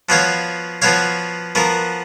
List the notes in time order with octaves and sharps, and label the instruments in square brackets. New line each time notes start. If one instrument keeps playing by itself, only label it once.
[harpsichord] F3 B3 F#4 C#5 F5
F3 B3 F#4 C#5 F5
F3 B3 F#4 A#4